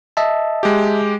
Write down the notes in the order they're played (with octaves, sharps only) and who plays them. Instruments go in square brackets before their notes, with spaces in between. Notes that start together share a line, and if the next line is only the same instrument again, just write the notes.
[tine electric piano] D#5 E5 A5
[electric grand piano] G#3 G4